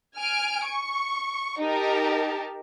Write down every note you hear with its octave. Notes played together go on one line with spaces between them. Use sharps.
G#5 F6 D7
C#6
D#4 G4 A#4 A5